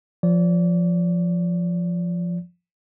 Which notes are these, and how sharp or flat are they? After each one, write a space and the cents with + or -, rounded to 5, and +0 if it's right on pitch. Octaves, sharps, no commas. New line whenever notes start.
F3 +0 D5 -30